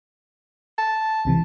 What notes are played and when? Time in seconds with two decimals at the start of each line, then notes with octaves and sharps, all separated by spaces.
0.78 A5
1.25 C#2 C3 E3